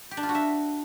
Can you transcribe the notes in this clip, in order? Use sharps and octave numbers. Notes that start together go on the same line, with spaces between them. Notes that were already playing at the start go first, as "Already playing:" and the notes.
G4
D4
F4
F#4
E5